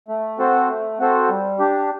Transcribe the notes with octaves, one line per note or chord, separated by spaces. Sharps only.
A3
C4 F#4 A4 C5
A3
C4 F#4 A4 C5
G3
D4 G4